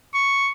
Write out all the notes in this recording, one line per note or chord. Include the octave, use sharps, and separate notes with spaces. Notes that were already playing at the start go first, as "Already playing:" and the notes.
C#6